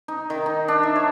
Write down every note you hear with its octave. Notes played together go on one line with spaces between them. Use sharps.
D#4
D#3
D#4
D4
E5
C#5